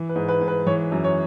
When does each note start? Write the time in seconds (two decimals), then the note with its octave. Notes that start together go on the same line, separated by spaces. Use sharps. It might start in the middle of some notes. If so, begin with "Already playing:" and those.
Already playing: E3
0.09 B4
0.16 G#2
0.29 B4
0.41 G#2
0.48 B4
0.66 E3 C#5
0.92 F#2
1.04 C#5